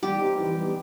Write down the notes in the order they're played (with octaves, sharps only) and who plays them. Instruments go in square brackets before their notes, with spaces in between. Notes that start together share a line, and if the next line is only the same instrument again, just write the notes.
[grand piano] G3 [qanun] G4
[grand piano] C4 D#4
E3
G3 B3